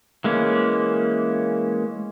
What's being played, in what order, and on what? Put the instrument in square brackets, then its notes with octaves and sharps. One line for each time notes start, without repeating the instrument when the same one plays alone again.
[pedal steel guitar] E3 G#3 A#3 C#4